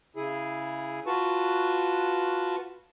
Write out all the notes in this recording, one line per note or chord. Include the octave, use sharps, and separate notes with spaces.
C#3 E4 G#4
F4 F#4 B4 A5 C#6